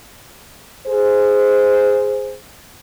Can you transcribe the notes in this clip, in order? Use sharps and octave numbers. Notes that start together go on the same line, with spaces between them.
G#4 C5